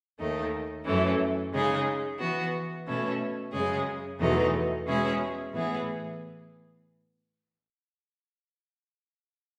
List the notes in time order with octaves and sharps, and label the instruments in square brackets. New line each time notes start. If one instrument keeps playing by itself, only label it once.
[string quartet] D#2 D#3 A3 D#4
F#2 E3 A3 C#4
C#3 G#3 D#4 G#4
E3 B3 F#4
B2 A3 C#4 E4 A4
F#2 C#3 G#3 C#4 G#4
E2 B2 F#3 A3 D#4
B2 G#3 C#4 E4 G#4
A2 E3 B3 E4 G#4